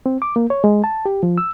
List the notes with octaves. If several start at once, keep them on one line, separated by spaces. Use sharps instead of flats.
C4
D6
A#3
C#5
G#3
A5
G4
F3
E6